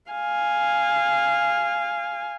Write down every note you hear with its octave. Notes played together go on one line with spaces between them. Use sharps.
F5 G#5